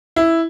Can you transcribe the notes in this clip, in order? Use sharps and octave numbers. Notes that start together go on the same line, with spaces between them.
E4